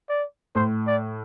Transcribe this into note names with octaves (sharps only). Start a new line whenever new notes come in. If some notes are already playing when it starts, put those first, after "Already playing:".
D5
A2 C5
D5